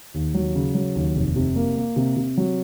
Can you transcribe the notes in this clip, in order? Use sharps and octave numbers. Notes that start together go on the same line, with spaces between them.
D#2
F#3
C#3
F#3
D#2
F1
C3
A#3
A#3
C3
C3
F#3